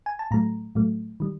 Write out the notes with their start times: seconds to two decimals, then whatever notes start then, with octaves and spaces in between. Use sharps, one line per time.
0.06 G#5
0.19 A5
0.31 A2 F#3 A3 A#5
0.75 A2 F#3 A3
1.20 D#3 G3